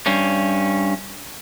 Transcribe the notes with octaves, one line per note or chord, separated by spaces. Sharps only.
G2 C#4